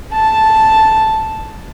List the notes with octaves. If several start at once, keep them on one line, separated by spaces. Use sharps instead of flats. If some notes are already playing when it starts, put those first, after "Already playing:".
A5